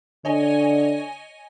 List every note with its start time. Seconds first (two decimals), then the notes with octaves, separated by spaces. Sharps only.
0.25 D3 C#5 D#5 G#5